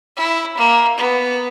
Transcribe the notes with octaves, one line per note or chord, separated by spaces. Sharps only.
E4
A#3
B3